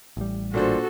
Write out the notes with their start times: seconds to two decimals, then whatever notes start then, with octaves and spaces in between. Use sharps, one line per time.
0.17 A1 G3
0.54 A#2 D4 F#4 A4 C5